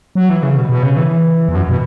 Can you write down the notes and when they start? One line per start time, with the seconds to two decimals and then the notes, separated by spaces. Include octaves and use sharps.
0.15 F#3
0.29 E3
0.43 C#3
0.56 B2
0.69 B2
0.83 C#3
0.97 E3
1.49 E2
1.55 F#2
1.70 B2